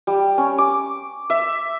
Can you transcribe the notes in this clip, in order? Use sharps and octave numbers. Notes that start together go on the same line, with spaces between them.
G3
C#4
D6
E5